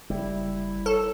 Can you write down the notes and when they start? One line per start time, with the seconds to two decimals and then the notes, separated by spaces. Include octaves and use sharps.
0.10 F#1 G3 E4
0.86 A4 C#5